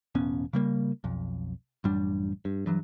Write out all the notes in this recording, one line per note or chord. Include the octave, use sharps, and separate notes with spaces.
E1 A1 B3 C#4
C#3 G3 A#3
B1 F2
A1 F#2 G3 D4
G2
G2 E3 F#3